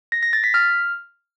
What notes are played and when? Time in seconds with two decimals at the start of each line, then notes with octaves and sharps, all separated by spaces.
0.12 A#6
0.23 A#6
0.33 A6
0.44 B6
0.54 F6